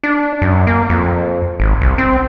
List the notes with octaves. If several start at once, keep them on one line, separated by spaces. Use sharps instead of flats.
D4
F#2
A#3
F2
G#1
C2
C4